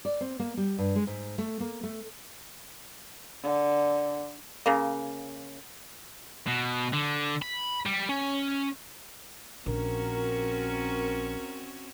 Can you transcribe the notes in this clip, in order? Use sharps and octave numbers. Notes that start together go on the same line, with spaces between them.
D5
C4
A#3
G3
G2
G#3
G#2
A3
A#3
A3
D3
C#3 A#3
B2
D3
B5
G3
C#4
A#1 C4 C#4 F#4 A#4